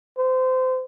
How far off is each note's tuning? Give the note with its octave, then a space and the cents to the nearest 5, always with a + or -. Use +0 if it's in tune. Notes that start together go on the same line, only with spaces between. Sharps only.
C5 -25